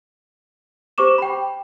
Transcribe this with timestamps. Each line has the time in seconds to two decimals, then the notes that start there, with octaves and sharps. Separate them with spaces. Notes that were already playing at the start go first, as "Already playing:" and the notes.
0.98 G4 C5 C#6 D6 E7
1.18 G5 B5